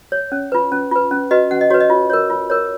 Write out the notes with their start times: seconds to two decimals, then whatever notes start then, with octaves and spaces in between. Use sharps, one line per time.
0.12 C#5
0.32 C#4
0.52 F4 B4
0.72 C#4
0.91 F4 B4
1.11 C#4
1.31 F#4 B4 D#5
1.51 C#4 F#5
1.61 D#5
1.70 F#4 B4 C#5
1.81 D#5
1.90 F4
2.10 A#4 C#5
2.30 F4
2.50 A#4 C#5